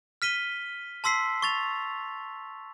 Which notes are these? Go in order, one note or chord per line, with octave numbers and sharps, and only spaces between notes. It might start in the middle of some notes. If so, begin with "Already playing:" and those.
F6 B6 D#7 G7
A5 C6 E6 B6 C7
C#6 A6 F7